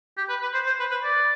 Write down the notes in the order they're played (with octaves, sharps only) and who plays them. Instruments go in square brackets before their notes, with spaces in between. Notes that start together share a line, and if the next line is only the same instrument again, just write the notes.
[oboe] G4
B4
B4
C5
C5
B4
B4
D5